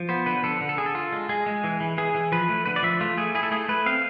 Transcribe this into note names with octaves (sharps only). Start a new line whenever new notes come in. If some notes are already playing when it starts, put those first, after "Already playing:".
Already playing: F3
B3 C5
D3 B4
D3 A4
D3
A4
D3 G#4
A4
F4
G#3
G#3 G#4
G#3
E3
E3
E3 G#4
E3
F3 B4
A3
D3 B4
D5
F3 E5
A3 F4
A3 G#4
E4 G#4
A4
A3 G#4
A3 B4
C4 F5